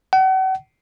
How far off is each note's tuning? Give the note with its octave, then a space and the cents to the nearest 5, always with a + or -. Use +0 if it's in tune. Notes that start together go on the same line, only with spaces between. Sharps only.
F#5 +40